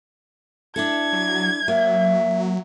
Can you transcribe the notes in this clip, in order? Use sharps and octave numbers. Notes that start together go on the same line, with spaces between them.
D4 E4 A4 G#6
F#3
F#3 A#3 E5